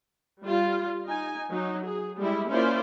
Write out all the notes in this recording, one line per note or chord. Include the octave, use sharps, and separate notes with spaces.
G3 F4
D#4 G#5
F#3 D#4
G#4
G3 G#3 E4
A#3 C#4 E4 F4 C5 D5